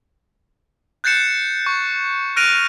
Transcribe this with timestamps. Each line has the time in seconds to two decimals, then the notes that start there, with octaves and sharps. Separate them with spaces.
1.04 F#6 G6 A6 C7 C#7 E7
1.67 C#6
2.36 F6 F#6 A#6 D7 D#7 F7